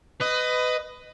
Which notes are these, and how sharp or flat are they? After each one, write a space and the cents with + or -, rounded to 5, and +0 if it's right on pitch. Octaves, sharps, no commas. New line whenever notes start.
B4 +25 D#5 +0